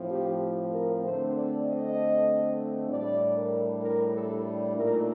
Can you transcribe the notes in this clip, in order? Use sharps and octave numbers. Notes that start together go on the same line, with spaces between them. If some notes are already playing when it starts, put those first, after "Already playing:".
Already playing: A2 F3 C4
G4
A#4
D3 A3 C4 C5
D5
D#5
A2 G3 D4 D5
A#4
A#4
A4
A#2 A3 D#4 A#4